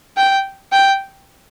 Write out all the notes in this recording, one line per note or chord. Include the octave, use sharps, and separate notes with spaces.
G5
G5